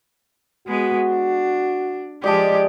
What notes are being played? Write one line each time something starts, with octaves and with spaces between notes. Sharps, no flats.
G#3 B3 F#4 B4
D4
F3 G#3 G4 D5 D#5 A5